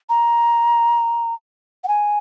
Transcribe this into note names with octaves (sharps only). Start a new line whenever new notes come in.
A#5
F#5
G#5